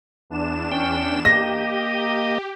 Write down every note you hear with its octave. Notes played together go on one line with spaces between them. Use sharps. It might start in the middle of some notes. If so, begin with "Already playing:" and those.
E2 D4 E7
C#4 G5
A#3 G4 D#5 A#6